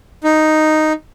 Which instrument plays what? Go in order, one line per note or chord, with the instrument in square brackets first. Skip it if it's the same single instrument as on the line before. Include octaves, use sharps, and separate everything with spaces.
[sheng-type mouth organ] D#4